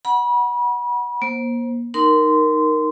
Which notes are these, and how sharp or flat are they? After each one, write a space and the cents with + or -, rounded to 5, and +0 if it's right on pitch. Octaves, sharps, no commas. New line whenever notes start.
F#5 +0 B5 -35
A#3 +35 C5 +15
D#4 +0 A#4 +0 C6 -15